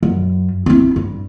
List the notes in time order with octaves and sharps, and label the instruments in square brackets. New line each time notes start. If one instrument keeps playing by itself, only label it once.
[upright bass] F#2
C4 E4
G2